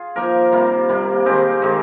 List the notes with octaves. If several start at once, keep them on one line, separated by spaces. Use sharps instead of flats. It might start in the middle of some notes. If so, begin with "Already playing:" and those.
Already playing: F4 G#4
F3 A#3 D#4 A#4
C3 G3 A#3 F4
C3 G3 A#3
D#3 G#3 C4 D#4 G4
D#3 G#3 C4 D#4